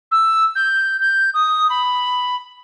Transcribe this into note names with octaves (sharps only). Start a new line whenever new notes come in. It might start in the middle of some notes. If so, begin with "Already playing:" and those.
E6
G6
G6
D#6
B5